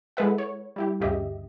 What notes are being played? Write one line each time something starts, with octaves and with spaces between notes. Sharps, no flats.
G#3 E4 A4 B4 E5 F#5
C#5
G3 E4 G4
D2 G2 C#3 G4 D#5 E5